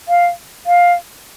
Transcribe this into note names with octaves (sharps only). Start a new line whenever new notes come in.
F5
F5